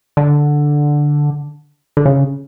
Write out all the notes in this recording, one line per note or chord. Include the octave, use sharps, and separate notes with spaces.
D3
D3
C#3